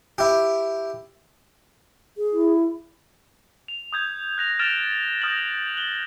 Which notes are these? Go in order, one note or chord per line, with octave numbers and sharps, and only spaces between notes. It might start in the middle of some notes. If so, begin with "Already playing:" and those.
E4 G4
G#4
E4
F7
D#6 G6 G#6
F#6 A#6 F7
F6 A6 D7 E7
D#6 F6 G6 A#6 F#7
F#6 F#7 G7